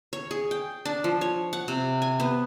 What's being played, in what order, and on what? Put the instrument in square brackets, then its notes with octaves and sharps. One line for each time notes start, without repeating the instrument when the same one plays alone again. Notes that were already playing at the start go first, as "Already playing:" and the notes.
[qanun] C#5
G#4
G5
D4
F3
C#5
F#5
C3
G#5
B3